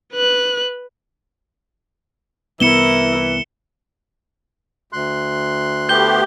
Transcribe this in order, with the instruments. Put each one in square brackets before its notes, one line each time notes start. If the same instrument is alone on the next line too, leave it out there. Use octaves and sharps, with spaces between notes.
[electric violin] B4 F#6
[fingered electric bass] C2 B3 [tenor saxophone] E3 [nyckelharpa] E4 A#4 [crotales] C#7 E7 G7
[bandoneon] D2 C6 F#6
[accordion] A3 B3 G4 [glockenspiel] G6 G7